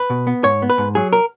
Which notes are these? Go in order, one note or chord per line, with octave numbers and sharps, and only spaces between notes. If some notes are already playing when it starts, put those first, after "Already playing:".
Already playing: B4
B2
B3
G#2 C#5
B3
B4
G#2
F#3 G#4
A#4